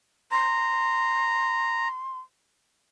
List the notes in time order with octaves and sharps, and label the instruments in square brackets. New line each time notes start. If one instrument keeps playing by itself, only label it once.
[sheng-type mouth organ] A#5 [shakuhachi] C6